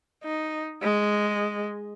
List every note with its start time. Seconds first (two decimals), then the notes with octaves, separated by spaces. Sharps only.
0.24 D#4
0.82 G#3